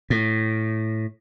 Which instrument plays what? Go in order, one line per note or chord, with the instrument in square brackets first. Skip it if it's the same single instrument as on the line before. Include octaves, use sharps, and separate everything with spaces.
[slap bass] A2